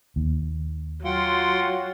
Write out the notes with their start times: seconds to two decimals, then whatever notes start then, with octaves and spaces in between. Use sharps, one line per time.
0.16 D#2
1.05 F#3 F4 F#5 G5 C6